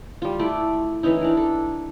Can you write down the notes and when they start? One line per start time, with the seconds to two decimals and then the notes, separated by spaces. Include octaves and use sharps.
0.22 G3 F4
0.39 A3 E4 D5
1.03 E3 C#4 D#4 E4
1.21 D4 A#4
1.37 A4